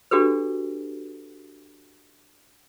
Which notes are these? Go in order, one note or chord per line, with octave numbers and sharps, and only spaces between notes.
D4 F#4 G4 A4 B4